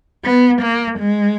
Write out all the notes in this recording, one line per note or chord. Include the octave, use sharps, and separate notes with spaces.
B3
A#3
G#3